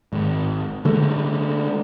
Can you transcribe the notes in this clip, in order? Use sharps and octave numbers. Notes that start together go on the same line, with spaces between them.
G#1
D3 G#3 A3